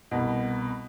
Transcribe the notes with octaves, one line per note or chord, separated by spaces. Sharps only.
C2 B2